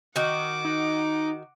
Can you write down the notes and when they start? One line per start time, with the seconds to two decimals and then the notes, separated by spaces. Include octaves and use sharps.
0.16 D#3 F#4 F#5 D6
0.65 D#4